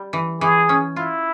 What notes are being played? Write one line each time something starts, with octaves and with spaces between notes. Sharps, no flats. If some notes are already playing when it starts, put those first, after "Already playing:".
Already playing: G3
E3
E3 G#4
C#4
E4 F4